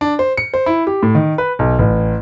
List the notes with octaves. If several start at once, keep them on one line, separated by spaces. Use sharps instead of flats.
D4
C5
C#7
C5
E4
G4
A2
D#3
B4
B1
A1